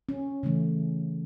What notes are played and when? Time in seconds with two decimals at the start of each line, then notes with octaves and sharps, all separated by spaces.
0.09 C#4
0.43 C#3 E3 A3